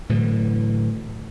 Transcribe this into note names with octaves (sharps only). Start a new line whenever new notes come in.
A2 D3 E3 F#3